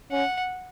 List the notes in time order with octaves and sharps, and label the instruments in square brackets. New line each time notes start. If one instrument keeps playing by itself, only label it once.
[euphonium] C#4 [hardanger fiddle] F#5